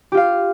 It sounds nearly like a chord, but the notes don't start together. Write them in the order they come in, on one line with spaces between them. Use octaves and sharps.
G4 F4 F5